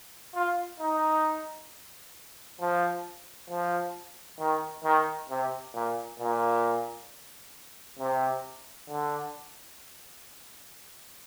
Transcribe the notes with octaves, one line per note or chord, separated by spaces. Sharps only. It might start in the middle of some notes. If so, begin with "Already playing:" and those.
F4
D#4
F3
F3
D#3
D#3
C3
A#2
A#2
C3
D3